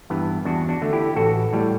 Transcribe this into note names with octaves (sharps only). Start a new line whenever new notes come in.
G2 E3 B3
E2 D4 F#4
D4 F#4
D3 A3
E4 G4
A1 F#4 A4
A2 G3